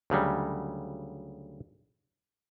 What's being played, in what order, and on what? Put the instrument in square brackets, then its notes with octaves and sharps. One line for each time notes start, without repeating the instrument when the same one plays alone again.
[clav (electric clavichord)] D2 C#3 F#3 G3